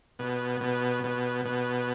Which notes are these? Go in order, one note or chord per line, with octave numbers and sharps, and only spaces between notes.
B2
B2
B2
B2